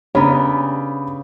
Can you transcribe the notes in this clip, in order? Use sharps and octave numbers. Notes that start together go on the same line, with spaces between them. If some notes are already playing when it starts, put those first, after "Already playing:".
C#3 B3 C#4 D4 G4 C#5 A#5 B5